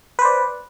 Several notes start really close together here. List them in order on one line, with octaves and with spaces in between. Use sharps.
B4 C5 D5